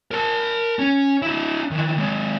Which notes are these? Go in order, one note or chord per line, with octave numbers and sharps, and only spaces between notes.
A#4 A5
C#4
D4 E4
D#3 E3
D#2 G#3